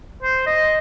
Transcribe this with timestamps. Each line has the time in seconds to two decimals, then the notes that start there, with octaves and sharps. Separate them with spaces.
0.23 C5
0.46 D#5